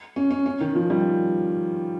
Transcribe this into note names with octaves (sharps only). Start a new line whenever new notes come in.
C#4
C#4
C#4
D#3
F3
G3